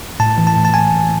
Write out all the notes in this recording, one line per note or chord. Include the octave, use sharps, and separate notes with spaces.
A2 A5
E3
A5
A2
A5
E3 G#5
A2